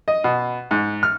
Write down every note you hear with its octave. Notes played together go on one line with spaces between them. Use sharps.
D#5
B2
G#2
F6